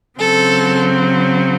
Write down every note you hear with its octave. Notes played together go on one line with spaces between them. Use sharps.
C#3 F#3 C4 A4